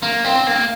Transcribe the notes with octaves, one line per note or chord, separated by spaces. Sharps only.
A#3
C4
A#3